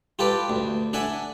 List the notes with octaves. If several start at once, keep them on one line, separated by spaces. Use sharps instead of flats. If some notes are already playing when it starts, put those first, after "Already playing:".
F4 G4 A4 B4 D5
D2
D4 A4 E5 F#5 G#5